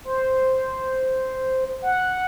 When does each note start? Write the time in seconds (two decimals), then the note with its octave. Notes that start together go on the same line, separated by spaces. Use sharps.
0.05 C5
1.82 F#5